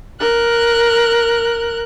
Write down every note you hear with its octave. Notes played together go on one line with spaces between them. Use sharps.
A#4 F#6